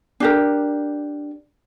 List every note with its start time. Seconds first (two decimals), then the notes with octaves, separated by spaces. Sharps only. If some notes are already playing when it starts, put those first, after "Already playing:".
0.20 D4 G4 A#4